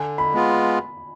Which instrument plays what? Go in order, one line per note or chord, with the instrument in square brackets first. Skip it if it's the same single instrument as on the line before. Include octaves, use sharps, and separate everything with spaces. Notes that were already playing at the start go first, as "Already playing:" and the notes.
Already playing: [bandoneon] D3 [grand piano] G#5
[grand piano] B5
[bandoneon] G#3 B3 F4